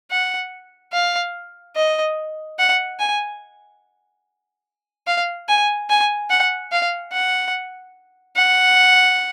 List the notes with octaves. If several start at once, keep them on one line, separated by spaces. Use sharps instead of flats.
F#5
F5
D#5
F#5
G#5
F5
G#5
G#5
F#5
F5
F#5
F#5